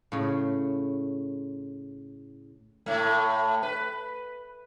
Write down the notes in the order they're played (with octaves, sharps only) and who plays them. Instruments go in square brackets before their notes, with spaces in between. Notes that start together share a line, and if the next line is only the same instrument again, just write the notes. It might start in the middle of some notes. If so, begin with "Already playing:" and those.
[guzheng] A2 C#3
[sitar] A2 A3
B4